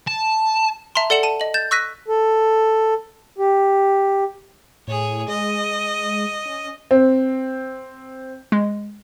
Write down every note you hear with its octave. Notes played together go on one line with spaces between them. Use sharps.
A5
E5 A5 A#5 C6
A4 D5 F#5 C#7 E7 F#7
A5 D#7
D#5 F#7
G6 A6 E7
C#6 E6 F#6 A#6 B6 D#7
A4
G4
A2 G#4 C#5
G#3 D#5
C#4
C4
G#3